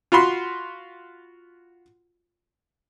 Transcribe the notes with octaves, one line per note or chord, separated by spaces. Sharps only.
F4 F#4 B5 C6